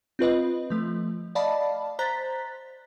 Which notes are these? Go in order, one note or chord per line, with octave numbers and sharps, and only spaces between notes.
C4 F4 B4 D#5
F3 A3
D5 D#5 F5 A5 B5
C5 A#5 F#6 A6 B6